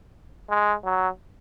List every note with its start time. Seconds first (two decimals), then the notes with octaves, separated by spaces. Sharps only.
0.50 G#3
0.85 F#3